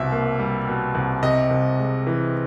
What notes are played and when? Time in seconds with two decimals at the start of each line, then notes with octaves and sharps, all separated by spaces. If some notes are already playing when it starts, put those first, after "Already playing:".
Already playing: C2 B2 E5
0.12 A#3
0.39 G3
0.67 B2
0.95 C2
1.23 C3 D#5
1.51 C2
1.79 G#3
2.07 E3